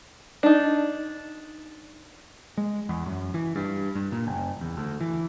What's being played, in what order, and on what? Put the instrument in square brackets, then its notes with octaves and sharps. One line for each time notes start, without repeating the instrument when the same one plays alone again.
[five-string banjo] D4 D#4
[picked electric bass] G#3
E2
F#2
E3
G2
G2
A#2
F#1
E2
D2
E3